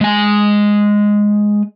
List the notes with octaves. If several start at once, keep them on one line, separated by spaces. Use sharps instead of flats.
G#3 G#5